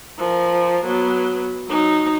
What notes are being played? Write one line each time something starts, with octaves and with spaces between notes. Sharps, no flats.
F3 A#4
F#3 B3
F#3 D#4